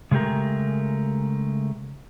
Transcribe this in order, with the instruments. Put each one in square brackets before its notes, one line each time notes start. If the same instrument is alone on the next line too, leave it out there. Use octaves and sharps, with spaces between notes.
[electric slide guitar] C#3 G#3 A3 G4 A#4